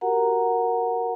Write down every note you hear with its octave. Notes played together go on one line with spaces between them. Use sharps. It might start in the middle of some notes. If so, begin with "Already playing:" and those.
F#4 G4 A#4 F#5 A#5